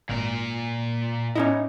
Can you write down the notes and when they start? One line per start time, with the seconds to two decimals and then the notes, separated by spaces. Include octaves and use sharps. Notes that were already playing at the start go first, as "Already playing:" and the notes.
0.09 G#1 A#2 A#4
1.35 A2 C#4 D#4 E4 D#5